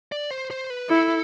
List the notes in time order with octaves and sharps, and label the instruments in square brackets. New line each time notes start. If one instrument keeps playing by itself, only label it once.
[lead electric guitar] D5
C5
C5
B4
[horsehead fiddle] E4 [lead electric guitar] A4